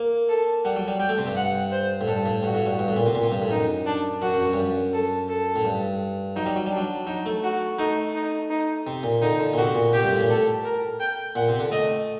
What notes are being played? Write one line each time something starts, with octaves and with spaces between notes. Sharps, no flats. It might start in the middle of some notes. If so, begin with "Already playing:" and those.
Already playing: A#3
A4
G3 F#5
F#3
G3
G3 G5
A3
C3
G2
F#5
C5
A2
G2 A4
A2
G2 F#4
A2
G2
G2
A2
A#2
C3
A#2
C3
G2
A2
F#2 D#4
D4
F#2 F#4
F#2
F#2
G2
F#2
A4
A4
A2
G2
F#3 D#4
G3
F#3
G3
D4
F#3
F#3 D#4
A3
F#4
A3 D#4
D#4
D#4
C3
A#2
D3 D#4
D3
A#2
C3 F#4
A#2
C3 G4
G2
A2
A#2
A2 A4
A#4
G5
A#2 F#5
C3
D3
A3 D#5